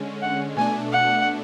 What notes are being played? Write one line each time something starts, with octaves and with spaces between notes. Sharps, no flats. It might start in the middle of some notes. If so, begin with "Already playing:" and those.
Already playing: D3 G#3 C#4
F#5
B2 A3 D4 G#5
F#5